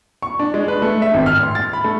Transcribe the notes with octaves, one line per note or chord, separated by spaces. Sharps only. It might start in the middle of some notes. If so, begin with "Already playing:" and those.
C#6
D4
G#3
B4
A3
E5
G#1
F6
C6
A6
B5
A3